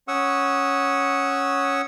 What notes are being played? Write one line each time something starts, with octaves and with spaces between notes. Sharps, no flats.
C#4 F#5 C#6 D#6 E6